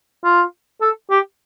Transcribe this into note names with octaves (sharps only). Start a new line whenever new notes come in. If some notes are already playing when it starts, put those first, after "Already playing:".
F4
A4
G4